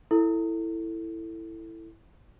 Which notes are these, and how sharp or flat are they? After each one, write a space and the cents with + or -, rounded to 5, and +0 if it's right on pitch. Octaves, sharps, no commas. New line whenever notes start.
E4 +0 A4 +15